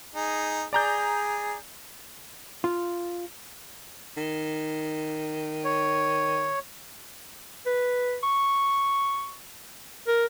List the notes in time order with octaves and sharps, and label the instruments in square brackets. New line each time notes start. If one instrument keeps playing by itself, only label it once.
[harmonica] D#4 G#4
[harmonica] G#4 [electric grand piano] D5 A#5 G6
[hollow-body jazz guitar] F4
[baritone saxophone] D#3
[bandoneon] C#5
[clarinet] B4
C#6
A#4